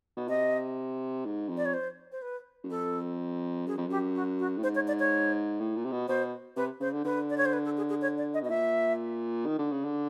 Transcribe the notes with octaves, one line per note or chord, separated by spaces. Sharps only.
B2
C3 D#5
G#2
F2
D5
C#5
C5
C5
B4
F#2
F2 A4
F#2 G#4
F2
F#2 G4
F#4
F#4
A2
G#2 C5
C#5
D5
C#5
A2
A#2
C3
B2
B2 C5
C3 B4
C#3 C5
D3
D3 B4
D5
C#5
C5
B4
A4
G#4
G#4
C#5
D5
D#5
B2
D#5
A#2 E5
D#3
D3
C#3
D3